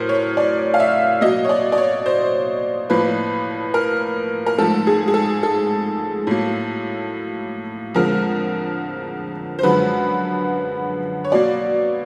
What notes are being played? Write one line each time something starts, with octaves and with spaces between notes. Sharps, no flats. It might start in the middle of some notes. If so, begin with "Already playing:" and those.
Already playing: A2 F#3 A#4 C5
C#5
D5
F5
E5
B2 F#3 A#3 D#5
C#5
D5
D5
C#5
C5
A2 F3 A#3 B4
A#4
A#4
G#2 F3 A3 A4
G#4
G#4
A4
A4
A2 F#3 A#3
F2 D3 F3 G#3 A#4
C5
F#2 D3 F3 G#3 B4
C#5
B2 F#3 A#3 D5